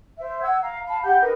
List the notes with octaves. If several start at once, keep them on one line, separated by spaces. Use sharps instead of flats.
C5 E5
F#5 E6 G#6
F5 A#5
F5 A5 B5
G4 F#5 B5 G6
D#4 A#4 B4